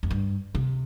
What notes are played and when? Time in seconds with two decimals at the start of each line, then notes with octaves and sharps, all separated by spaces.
0.03 F2
0.11 G2
0.55 C3